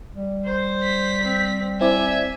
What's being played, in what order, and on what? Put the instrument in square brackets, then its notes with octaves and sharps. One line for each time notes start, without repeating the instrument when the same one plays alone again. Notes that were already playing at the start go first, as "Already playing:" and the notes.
[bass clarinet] G3
[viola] C5
[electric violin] B6
[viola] C4
[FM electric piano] C4 E4 D5 [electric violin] E5 [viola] G#5